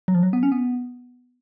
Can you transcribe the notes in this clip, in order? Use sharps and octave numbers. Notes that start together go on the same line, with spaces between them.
F#3
F3
F#3
B3
C#4
B3